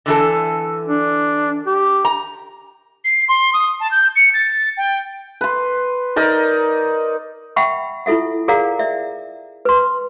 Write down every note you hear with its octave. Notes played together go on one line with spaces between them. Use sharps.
D3 E3 A4
D4
G4
A#5
C7
C6
D#6
A5
G6
C#7
A6
G5
B4 C6
D#4 A#4 D5
E5 F#5 G5 B5 C#6
E4 F4 A4 E5 F#5
G#4 A#4 D5 F5 F#5 A#5
D5 E5
B4 C6